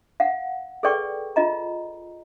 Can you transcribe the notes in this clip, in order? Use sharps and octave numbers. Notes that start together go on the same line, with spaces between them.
F5 F#5
G#4 A4 B4 D5 G5 C#6
F4 D#5 A#5